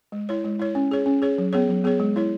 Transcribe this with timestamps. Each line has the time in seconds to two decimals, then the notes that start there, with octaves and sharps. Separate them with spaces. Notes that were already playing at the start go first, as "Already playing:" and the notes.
0.12 G#3
0.29 E4 C#5
0.44 G#3
0.59 E4 C#5
0.75 C#4
0.91 G#4 C#5
1.06 C#4
1.22 G#4 C#5
1.38 F#3
1.53 B3 G#4 C#5
1.69 F#3
1.84 B3 G#4 C#5
2.00 G#3
2.16 E4 C#5